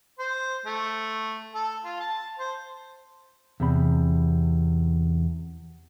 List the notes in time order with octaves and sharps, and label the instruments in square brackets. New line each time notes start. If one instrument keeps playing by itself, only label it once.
[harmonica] C5
A3
A4
F4
A5
C5
[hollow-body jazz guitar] E2 C3 B5